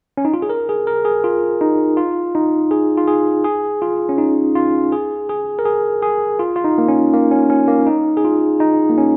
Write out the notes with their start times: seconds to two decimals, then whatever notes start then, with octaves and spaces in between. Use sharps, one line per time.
0.17 C#4
0.25 D#4
0.34 F4
0.42 G#4
0.50 A#4
0.69 G#4
0.87 A#4
1.05 G#4
1.24 F4
1.61 D#4
1.97 F4
2.35 D#4
2.71 G#4
2.97 F4
3.08 G#4
3.44 G#4
3.82 F4
4.09 C#4
4.18 D#4
4.55 F4
4.92 G#4
5.29 G#4
5.59 A#4
5.65 G#4
6.02 G#4
6.39 F4
6.56 F4
6.64 D#4
6.78 A#3
6.88 C#4
7.13 A#3
7.31 C#4
7.50 C#4
7.68 A#3
7.86 D#4
8.17 G#4
8.24 F4
8.60 D#4
8.90 A#3
8.98 C#4